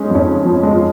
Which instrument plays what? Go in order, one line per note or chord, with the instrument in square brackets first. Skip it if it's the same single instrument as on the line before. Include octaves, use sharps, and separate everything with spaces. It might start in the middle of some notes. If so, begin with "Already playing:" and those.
Already playing: [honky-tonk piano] G#3 C#4 D#4
F2
C#4
C#3
F3
G#3
F4